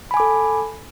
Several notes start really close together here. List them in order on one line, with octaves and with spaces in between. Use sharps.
B5 G#5 D6 A4